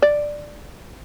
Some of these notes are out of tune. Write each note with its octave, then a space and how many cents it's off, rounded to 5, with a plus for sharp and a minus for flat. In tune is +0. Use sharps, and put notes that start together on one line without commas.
D5 +5